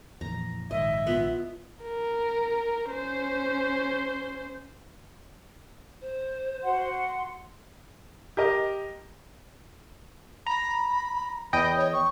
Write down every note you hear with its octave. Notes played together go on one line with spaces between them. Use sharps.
F2 A#2 E3 A#5
A#1 G#2 D#3 D#5 E5
B3 F4
A#4
C#4 C5
C5
F#4 F#5 C6
G4 A#4 D#5
A#5 B5
E2 D#5 G5 B5
C#5
C#6